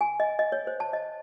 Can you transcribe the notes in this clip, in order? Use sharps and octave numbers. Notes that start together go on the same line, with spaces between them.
G#5
D#5
D#5
C#5
C5
A5
D#5